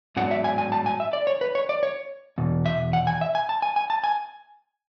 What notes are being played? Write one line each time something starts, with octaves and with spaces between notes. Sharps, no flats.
G#2 F#3 B3 D4 F#5
E5
G#5
G#5
A5
G#5
E5
D5
C#5
B4
C#5
D5
C#5
E2 B2
E5
F#5
G#5
E5
G#5
A5
G#5
G#5
A5
G#5